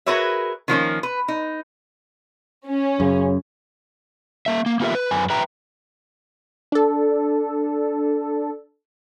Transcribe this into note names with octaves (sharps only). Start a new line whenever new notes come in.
F#4 G#4 A#4 B4 C#5 E5
D#3 F3 A#3 C#4
B4
D#4
C#4
F#2 C#3
A#3 E5
A#3
A#3 B3 F4 G4 A#4 E5
B4
F#2 B4 G#5
B4 E5 G5 A#5
D4 A4